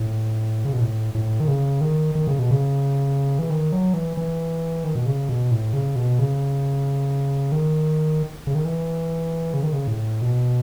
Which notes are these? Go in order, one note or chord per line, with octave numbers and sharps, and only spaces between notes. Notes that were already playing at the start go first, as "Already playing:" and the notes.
Already playing: A2
C#3
B2
A2
A2
D#3
C#3
D#3
D#3
C#3
B2
C#3
E3
D#3
F#3
E3
E3
D#3
B2
C#3
B2
A2
C#3
B2
C#3
D#3
C#3
D#3
E3
C#3
D#3
C#3
A2
B2